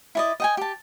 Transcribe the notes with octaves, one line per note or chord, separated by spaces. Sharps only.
E4 D5 D#5
D#5 G5 G#5
G4 A5